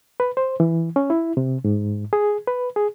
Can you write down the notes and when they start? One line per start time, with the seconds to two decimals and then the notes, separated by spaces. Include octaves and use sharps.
0.20 B4
0.37 C5
0.60 E3
0.96 C#4
1.10 E4
1.37 C3
1.64 G#2
2.13 G#4
2.47 B4
2.76 G#4